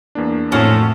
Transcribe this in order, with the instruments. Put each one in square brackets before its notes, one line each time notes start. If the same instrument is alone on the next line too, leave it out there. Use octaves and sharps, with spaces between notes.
[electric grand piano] E2 A#3 D4
[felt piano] F2 A2 [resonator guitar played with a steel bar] F3 C#4 F#4 [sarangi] A3